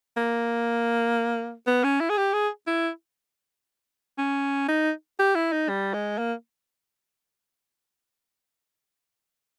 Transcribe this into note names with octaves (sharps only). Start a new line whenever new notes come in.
A#3
B3
C#4
E4
G#4
G4
G#4
E4
C#4
D#4
G4
E4
D#4
G3
G#3
A#3